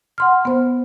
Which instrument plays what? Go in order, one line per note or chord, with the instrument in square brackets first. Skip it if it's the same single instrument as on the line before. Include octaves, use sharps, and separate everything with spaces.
[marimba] F#5 C6 F6
B3 C5